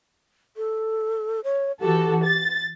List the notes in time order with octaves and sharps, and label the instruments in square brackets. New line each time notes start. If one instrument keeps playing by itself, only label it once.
[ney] A4
C#5
[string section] E3 F#4 A4 [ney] G4
[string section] A6